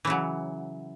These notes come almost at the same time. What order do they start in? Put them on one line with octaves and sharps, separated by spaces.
E3 C#3 F#3